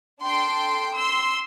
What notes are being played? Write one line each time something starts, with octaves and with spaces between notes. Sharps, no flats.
D4 A4 G5 C6
C6 E6